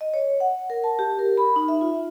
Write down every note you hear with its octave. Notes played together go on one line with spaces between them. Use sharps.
D#5
C#5
F#5
A#4
A5
G4
A#4
B5
D#4
E5
F4